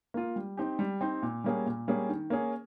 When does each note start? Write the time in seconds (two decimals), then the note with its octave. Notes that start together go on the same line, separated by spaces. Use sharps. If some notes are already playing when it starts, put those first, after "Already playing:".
0.14 A#3 F4
0.36 G3
0.57 C4 D#4 G4
0.79 G3
1.01 C4 D#4 G4
1.22 A#2
1.44 G3 A#3 C#4 G#4
1.66 A#2
1.88 G3 A#3 C#4 G#4
2.09 D#3
2.30 A#3 C#4 G#4